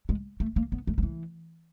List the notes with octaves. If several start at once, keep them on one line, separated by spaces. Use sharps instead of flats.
G#3
A3
A#3
B3
A3
F3
E3